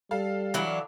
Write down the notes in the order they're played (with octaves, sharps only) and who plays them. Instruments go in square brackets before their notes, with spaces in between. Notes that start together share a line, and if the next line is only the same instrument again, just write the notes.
[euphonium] G3 [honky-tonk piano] A4 F5
[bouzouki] E3 F#3 D4